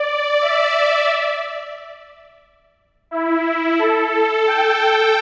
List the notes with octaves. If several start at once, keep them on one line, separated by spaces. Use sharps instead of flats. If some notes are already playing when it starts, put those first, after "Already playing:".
Already playing: D5
E5
E4
A4
G5